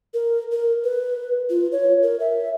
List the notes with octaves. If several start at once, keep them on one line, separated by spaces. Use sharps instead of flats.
A#4
A#4
B4
F4
C#5
A#4
E5